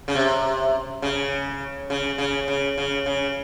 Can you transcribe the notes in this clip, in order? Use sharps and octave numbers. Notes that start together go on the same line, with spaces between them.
C#3
C3
C#3
C#3
C#3
C#3
C#3
C#3